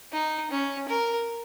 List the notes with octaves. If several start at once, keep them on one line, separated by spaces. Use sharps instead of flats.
D#4
C#4
A#4